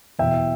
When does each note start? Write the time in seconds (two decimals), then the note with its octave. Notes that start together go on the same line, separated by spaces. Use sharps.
0.19 E2 B2 E5 G5